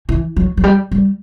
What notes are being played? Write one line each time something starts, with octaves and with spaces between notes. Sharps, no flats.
E3
F#3
F#3
G3
G3